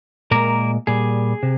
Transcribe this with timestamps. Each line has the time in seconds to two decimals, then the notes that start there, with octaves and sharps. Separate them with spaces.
0.31 A#2 G#3 A#3 A#4
0.87 A#2 G3 G#4
1.43 C3